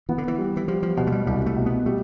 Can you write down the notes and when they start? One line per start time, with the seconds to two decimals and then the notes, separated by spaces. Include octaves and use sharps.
0.09 E3 B3
0.18 D3
0.28 E3
0.38 G3
0.57 E3
0.68 F3 G3
0.83 F3
0.97 B2 F3
1.07 A3
1.12 G3
1.26 C2 G3
1.46 A3
1.56 B2
1.66 B3
1.86 G3 A3